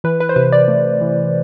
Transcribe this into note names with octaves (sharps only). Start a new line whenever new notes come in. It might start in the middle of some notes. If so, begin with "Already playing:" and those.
E3 B4
B4
C5
C3 B4
D5
A3
E3